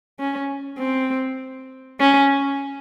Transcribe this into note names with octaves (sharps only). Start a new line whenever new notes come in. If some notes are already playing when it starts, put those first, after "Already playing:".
C#4
C4
C#4